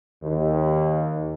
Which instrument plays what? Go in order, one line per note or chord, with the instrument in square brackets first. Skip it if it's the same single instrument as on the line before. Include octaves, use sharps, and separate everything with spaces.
[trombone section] D#2